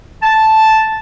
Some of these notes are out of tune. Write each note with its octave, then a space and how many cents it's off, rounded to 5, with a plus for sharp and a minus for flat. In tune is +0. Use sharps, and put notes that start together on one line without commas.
A5 -5